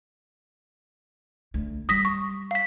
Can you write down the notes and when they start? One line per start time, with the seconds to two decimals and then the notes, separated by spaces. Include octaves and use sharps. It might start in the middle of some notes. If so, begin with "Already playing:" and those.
1.54 D2
1.89 G3 D#6 A#6 B6
2.05 C#6
2.51 F5 B6